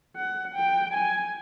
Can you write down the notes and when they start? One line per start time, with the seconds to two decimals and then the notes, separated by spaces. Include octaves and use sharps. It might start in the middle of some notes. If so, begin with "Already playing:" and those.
0.16 F#5
0.55 G5
0.94 G#5